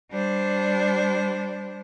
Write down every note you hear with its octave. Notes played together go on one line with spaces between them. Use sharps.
G3 D4 C5